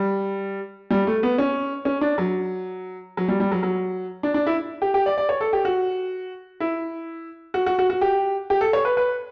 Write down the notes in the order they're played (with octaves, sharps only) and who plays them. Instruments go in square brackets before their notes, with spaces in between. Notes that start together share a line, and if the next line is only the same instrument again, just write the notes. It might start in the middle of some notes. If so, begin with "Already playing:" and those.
Already playing: [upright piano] G3
G3
A3
B3
C#4
C#4
D4
F#3
F#3
G3
G3
F#3
F#3
D4
D4
E4
G4
G4
D5
D5
C#5
A4
G4
F#4
E4
F#4
F#4
F#4
F#4
G4
G4
A4
C#5
B4
B4